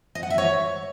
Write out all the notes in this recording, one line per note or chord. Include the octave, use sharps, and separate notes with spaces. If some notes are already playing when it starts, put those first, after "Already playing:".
D#5
F#5
E5
C#5